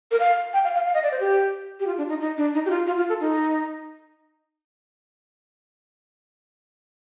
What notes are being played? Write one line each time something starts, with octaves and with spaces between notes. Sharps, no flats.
A#4
F5
G5
F5
F5
F5
D#5
D5
C5
G4
G4
F4
D4
D#4
D#4
D4
D#4
G4
F4
F4
F4
A4
D#4